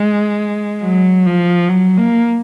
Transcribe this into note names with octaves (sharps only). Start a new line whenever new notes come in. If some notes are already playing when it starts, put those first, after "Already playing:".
Already playing: G#3
F#3
F3
F#3
A#3